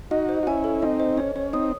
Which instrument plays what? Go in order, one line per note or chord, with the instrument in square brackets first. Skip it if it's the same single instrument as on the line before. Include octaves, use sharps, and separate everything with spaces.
[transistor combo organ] D#4 F#4 [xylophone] D#5
[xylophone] C5
[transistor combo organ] F#4
[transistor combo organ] C#4 E4 [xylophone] G#5
[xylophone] A4
[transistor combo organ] C4 D#4 [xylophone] D#5
[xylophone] C5
[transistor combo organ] C#4 [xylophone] C#5
[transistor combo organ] C#4 [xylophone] C#5
[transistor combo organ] C4 D#4 [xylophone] D#6